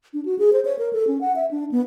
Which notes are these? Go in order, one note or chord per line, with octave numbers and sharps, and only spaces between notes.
D4
F#4
G#4
C5
C#5
A#4
A4
C#4
F#5
E5
D4
B3